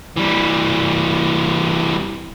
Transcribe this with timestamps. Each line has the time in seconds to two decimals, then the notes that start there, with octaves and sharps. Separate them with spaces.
0.17 E3 G3